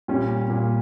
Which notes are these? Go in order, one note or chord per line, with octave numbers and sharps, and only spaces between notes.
A#2 G3 C#4
A#2 G3